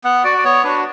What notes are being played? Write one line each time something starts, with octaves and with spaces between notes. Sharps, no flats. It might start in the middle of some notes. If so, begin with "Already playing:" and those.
B3 F#5
F#4 D5
D5
B3 C#5
D4 F#4 B4